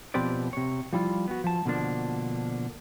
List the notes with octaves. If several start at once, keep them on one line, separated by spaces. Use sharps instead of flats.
B2 F3 C4 G4 B4 D5
C3 C#5
F3 G3 E4 F4
B3 F#4
F3 A5
B2 D3 F3 A#3 D4